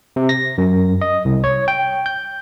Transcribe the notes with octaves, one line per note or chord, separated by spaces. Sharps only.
C3
A#6
F#2
D#5
C2
C#5
G5
G6